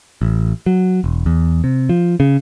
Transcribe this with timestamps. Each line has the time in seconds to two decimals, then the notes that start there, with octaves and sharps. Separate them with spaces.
0.21 A1
0.66 F#3
1.04 E1
1.26 E2
1.64 C3
1.89 F3
2.20 C#3